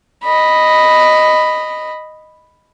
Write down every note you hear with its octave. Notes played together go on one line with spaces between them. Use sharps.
D#5 B5